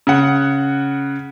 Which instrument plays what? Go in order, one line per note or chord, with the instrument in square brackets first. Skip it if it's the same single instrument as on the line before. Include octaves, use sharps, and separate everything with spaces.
[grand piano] C#3 F#5